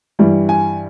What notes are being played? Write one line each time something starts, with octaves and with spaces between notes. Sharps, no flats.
G2 E3 G3
G#5